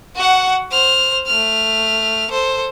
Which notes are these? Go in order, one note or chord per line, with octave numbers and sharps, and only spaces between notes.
F#4 F#5
C5 F6
A3 F6
A4 C5